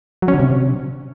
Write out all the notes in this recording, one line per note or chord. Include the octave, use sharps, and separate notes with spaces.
F#3
C#4
D3
C3